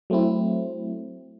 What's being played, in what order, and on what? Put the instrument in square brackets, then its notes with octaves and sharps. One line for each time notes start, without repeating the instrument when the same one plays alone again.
[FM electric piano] F#3 A3 C4 E4